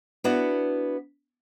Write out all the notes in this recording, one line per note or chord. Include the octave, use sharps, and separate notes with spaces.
B3 D4 E4 F#4